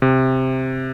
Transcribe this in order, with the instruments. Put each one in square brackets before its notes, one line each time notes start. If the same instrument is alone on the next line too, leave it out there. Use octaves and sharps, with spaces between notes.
[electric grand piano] C3